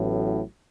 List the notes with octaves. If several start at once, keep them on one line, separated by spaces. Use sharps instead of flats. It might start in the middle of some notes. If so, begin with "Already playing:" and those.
Already playing: A1 A2 F#3 B3